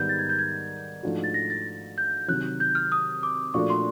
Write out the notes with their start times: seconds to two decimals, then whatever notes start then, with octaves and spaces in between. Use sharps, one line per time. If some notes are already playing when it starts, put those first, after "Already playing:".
Already playing: G#2 D#3 G3 B3 G6
0.09 A6
0.19 G#6
0.30 G6
0.39 G#6
1.03 G#2 F3 A3 D4 F#4
1.24 A6
1.34 A#6
1.50 A6
1.98 G6
2.28 C3 D#3 F#3 F#6
2.60 G6
2.75 F6
2.92 D#6
3.23 D6
3.54 A#2 F3 A3 D4 F#4 C#6
3.70 C6